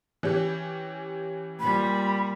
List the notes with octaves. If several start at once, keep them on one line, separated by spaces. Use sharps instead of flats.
E3 C#4 G4
A#2 G3 B5